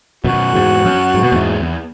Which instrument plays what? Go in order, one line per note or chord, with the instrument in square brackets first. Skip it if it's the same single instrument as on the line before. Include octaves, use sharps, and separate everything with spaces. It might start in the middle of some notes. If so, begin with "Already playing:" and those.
[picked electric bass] F#2 B2 [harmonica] F#4
[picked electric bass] E2 G#2
F#2
G#2
B2
E2 G#2
E2